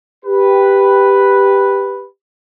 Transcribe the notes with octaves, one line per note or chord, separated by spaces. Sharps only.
G4 B4